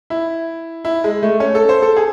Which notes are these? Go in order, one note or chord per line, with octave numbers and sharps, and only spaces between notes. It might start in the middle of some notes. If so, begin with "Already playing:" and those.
E4
E4
G#3
A3
C#4
A4
C5
A4
G#4